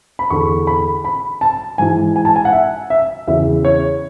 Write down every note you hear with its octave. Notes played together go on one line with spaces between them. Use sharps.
B5
E2 D3 C#6
B5
B5
A5
G#2 E3 G#5
G#5
A5
G#5
F#5
E5
E5
E2 C#3 E3 E5
C#5